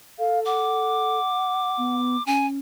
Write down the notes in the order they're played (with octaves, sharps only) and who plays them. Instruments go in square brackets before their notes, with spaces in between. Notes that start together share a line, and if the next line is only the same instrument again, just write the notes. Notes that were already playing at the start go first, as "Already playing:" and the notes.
[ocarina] A4 [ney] F5
[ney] F#5 [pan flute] D6
[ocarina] B3
[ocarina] C#4 [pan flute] G#5